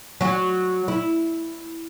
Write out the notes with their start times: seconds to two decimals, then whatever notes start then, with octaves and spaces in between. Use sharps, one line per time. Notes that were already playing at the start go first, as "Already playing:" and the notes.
0.21 F#3 F#4
0.88 E4